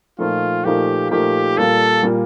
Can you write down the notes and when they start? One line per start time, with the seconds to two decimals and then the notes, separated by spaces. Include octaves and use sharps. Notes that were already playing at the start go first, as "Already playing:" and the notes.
0.19 A#2 F3 A3 D#4 F4 A#4
0.65 A#2 F3 A3 D#4 G4 A#4
1.11 A#2 F3 A3 D#4 G4 A#4
1.57 A#2 G3 A#3 F4 A4
2.03 A#2 G3 A#3 F4